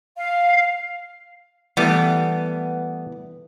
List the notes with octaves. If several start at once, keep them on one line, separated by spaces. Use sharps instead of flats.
F5
E3 G3 A3 B3